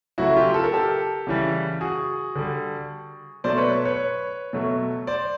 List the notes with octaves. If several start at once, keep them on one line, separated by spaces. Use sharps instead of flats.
C#3 F#3 A3 E4 F#4
F4 G4
A4
A#4
G4 A4
C#3 E3 G3
F#4 G#4
D3 G3
B2 F#3 A3 C5 D5
B4 C#5
B4 C#5
B2 F#3 A3
C5 D5